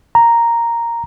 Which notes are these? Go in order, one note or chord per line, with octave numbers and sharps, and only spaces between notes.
A#5